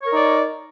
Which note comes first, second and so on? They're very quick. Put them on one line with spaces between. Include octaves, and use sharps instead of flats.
C#5 A#4 D#4 D5